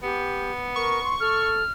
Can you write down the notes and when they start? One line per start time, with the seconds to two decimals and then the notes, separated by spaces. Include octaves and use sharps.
0.03 B3 G4
0.76 A#4 C#6
1.03 C6
1.20 A4 F6